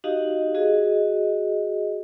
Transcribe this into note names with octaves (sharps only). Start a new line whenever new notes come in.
D#4 F#4 G4 D#5 F5
F#4 G#4 D#5